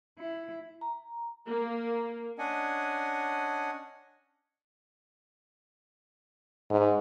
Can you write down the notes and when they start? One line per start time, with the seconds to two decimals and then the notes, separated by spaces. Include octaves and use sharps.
0.19 E4
0.81 A#5
1.47 A#3
2.38 C#4 D4 D#5 F#5 G#5
6.71 G#2